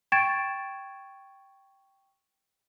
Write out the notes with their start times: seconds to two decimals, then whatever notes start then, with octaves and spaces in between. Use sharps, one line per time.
0.12 G5 C#6 G#6 A6 D7 E7